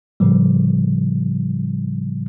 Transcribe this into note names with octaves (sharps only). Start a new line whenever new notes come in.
A2 C#3 F3 G3